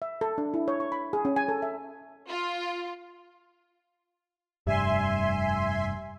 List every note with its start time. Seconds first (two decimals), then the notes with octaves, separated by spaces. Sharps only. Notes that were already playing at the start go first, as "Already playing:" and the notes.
0.02 E5
0.21 A4
0.38 D4
0.54 E4
0.68 C#5
0.80 C#6
0.92 B5
1.13 G#4
1.25 C#4
1.36 G#5
1.48 A4
1.62 E5
2.29 F4
4.67 F1 G2 G3 E5 G#5 C6